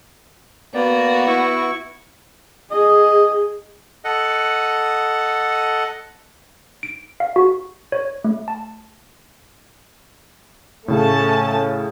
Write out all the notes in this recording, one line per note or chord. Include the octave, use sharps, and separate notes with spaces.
A#3 B3 F#4 D5
E4 C#6
G#4 D#5
A4 D#5 F#5
D7
F5
F#4
C#5
A3
A5
A2 C#3 A3 C#4 A5